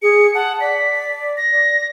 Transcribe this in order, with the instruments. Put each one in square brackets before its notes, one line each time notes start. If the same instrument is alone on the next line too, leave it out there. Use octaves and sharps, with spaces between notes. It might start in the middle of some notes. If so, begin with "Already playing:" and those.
[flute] G#4 [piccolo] C#7
[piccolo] F#5 [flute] A5
[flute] D5 [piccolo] B6
[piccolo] A#6